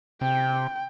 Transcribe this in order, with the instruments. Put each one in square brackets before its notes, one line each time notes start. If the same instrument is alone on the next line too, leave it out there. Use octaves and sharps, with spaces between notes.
[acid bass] C3 [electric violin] G5